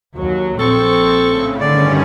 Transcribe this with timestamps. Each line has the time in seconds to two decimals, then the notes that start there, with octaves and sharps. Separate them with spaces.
0.15 D#2 F#3
0.59 A#1 C4 A4 C#6
1.26 A2 C#3
1.61 G2 D3 D#3 C#4 D5